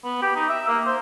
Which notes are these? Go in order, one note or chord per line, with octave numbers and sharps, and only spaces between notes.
B3
G4
D#4
E5
A#3
C5